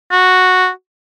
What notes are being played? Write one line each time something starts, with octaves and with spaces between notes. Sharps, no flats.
F#4